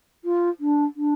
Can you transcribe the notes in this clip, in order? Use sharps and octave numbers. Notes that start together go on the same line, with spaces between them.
F4
D4
D4